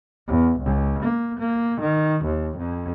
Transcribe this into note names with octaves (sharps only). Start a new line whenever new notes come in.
E2
C#2
A#3
A#3
D#3
D#2
F2